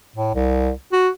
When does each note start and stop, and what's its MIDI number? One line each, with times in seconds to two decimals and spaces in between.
0.16 0.32 45
0.35 0.71 36
0.92 1.09 66